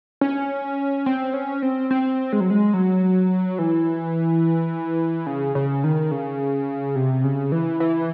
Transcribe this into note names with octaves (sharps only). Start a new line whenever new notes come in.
C#4
C4
C#4
C4
C4
G#3
F#3
G#3
F#3
E3
C#3
C#3
D#3
C#3
C3
C#3
E3
E3